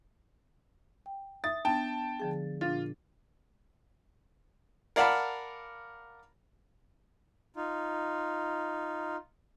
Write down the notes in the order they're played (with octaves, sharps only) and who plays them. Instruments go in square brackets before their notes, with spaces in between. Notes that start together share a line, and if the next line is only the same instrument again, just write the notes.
[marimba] G5
[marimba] E5 D#6 [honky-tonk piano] A6
[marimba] B3 D4 [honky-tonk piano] G5 A5
[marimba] D3 F3 G#4
[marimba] A#2 D4 A6 [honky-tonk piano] F4
[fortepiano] A#4 D5 F5 F#5 A5 B5
[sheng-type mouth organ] D#4 F4